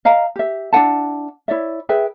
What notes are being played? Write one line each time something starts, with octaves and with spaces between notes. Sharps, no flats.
D#5 F5 A#5
G4 E5
D4 E4 F#5 A5
E4 C#5 D5 E5
G#4 B4 E5 G5